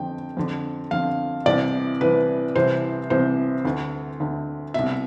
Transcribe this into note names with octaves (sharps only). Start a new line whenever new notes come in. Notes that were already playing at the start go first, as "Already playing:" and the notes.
Already playing: F2 D3 G5
F2 D3
F2 D3 F5
C2 C3 E3 D5
C2 C3 E3 B4
C2 C3 E3 C5
C2 C3 E3 C5
D2 D3
D2 D3
C2 B2 E5